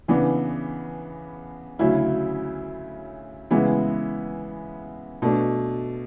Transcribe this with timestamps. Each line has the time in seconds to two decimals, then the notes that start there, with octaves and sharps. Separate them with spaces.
0.08 C#3 E3 B3 D4
1.79 D2 C#3 F#3 C#4 E4
3.51 C#3 E3 G#3 B3 E4
5.22 B2 A3 D4